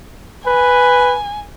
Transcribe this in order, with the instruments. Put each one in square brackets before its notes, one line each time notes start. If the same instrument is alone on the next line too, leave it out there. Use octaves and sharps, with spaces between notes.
[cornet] B4 [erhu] G#5